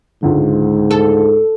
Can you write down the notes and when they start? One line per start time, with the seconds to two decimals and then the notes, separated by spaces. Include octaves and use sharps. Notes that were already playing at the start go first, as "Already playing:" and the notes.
0.23 C#2 G#2 D3
0.91 A4